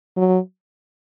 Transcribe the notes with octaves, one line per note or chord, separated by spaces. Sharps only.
F#3